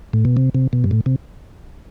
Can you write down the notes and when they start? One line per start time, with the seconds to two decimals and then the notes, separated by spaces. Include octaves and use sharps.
0.13 A2
0.25 B2
0.37 C3
0.55 C3
0.73 B2
0.84 G2
0.91 A2
1.06 C3